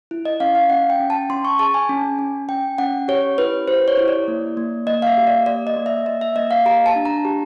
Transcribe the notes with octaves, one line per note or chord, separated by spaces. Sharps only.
E4
D#5
C#4 F5
F5
C#4 F#5
G5
C#4
A5
C#4 C6
C#6
G#4 A5
G#5
C#4
C#4
C#4 G5
C#4 F#5
G4 C#5
E4 B4
G4 C5
C#5
E4
D5
A#3
A#3
A#3 D#5
F5
E5
G4
D5
A#3 D5
D#5
A#3
E5
A#3 D#5
E5
A#3 D#5
F5
G4 A#5
A5
D4
A#5
G4